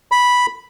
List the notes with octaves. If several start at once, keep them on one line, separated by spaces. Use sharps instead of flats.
B5